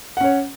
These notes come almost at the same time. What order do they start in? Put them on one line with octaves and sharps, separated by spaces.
F#5 C#4 C#5